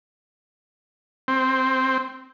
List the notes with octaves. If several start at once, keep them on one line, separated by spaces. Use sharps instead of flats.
C4